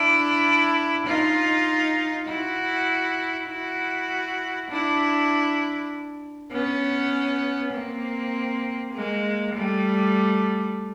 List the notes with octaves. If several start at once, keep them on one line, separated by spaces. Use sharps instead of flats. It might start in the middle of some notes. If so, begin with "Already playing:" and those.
Already playing: D4 E4
D#4 F4
E4 F#4
E4 F#4
D4 E4
B3 C#4
A#3 C4
G#3 A#3
G3 A3